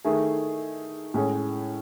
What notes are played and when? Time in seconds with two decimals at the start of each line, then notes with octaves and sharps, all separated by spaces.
0.04 D#3 A3 E4 G#4
1.14 A2 G#3 C#4 G#4